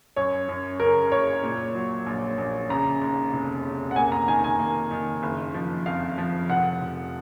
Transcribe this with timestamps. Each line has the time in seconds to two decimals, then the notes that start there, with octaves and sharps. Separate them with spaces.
0.16 F#2 C#5
0.48 F#2
0.80 C#3 A#4
1.12 F#1 C#5
1.43 A#2
1.75 F#3
2.06 A#1
2.38 A#1
2.70 C#3 A#5
3.01 D#2
3.33 F1
3.64 C#3
3.91 F#5
3.96 A#3 G#5
4.12 A#5
4.28 D#3 G#5
4.44 G#5
4.59 A#3
4.91 D#3
5.23 F#1
5.54 F3
5.86 F2 F5
6.18 F3
6.50 F1 F#5
6.81 F1